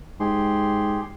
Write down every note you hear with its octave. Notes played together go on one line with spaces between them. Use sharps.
G#2 G4 G#4 C6